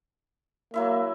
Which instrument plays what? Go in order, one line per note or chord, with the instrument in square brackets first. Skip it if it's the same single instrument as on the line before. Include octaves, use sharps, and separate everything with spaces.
[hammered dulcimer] F#3 E4 E5 [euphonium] A#3